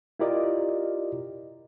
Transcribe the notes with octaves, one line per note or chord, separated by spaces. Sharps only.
E4 F4 G4 A#4 D5 D#5